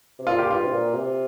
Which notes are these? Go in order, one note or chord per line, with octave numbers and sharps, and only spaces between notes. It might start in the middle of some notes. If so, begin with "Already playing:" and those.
C3
A#2 F4
G4
G2 F4
C3
A#2
C3